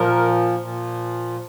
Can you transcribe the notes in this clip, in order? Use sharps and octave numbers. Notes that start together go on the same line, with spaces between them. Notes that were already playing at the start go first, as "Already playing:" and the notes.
Already playing: A#2 F3 A#4
A#2 F3